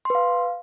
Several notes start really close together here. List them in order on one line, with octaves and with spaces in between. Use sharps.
C6 B4 F5